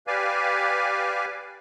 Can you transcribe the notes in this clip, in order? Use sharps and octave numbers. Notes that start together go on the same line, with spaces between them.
G4 B4 D5 F5 G#5